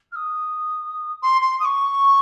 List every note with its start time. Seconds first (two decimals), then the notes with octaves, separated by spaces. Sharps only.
0.11 F6
0.15 D#6
1.22 C6
1.41 C6
1.59 D#6
1.64 C#6